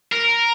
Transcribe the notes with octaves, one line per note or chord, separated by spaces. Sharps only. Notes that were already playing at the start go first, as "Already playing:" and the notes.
A#4